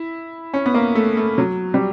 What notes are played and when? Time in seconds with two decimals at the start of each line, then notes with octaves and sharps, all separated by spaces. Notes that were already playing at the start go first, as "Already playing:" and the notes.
Already playing: E4
0.54 C#4
0.66 B3
0.74 A#3
0.95 A3
1.17 A3
1.38 F#3
1.74 G3